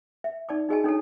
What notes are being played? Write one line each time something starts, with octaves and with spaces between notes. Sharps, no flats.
E5
D#4 D5 A5 D6
D#4 F#4 G#4 D#5 G#5 A5
D4 D#4 A4 C#5 G#5 A5